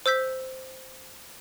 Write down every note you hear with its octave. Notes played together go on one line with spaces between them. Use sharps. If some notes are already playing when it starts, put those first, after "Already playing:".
C5 E6 G6 B6